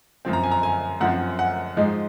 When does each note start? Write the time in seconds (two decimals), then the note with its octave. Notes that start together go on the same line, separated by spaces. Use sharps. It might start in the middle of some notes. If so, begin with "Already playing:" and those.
0.25 F#2 F3 C4
0.33 A#5
0.43 G#5
0.51 A#5
0.63 G#5
1.01 F#2 F3 C4 F#5
1.39 F#5
1.77 G#2 F3 G#3 D#4